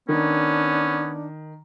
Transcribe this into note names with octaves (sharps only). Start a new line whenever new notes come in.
D#3 B3 C#4 D4